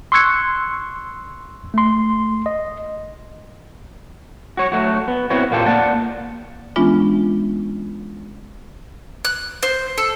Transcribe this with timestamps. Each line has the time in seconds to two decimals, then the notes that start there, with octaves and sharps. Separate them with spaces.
0.12 C6 C#6 E6 F#6 G#6 C#7
1.74 A3 C6
2.46 D#5
4.57 F#4 C#5
4.72 F#3 A3 F#4
5.08 B3
5.30 B3 C4 E4 F#4 C#5
5.51 A#2 A#3 F4 G4 A4
5.66 A#3 D5 F#5 A5
6.76 E3 G#3 B3 C#4 D4 F4
9.25 F#6
9.63 C5
9.98 A4